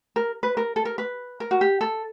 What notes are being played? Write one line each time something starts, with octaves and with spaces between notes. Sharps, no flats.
A#4
B4
A#4
A4
A#4
B4
A#4
F#4
G4
A4